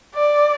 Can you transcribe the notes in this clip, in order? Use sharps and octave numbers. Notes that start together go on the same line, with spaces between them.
D5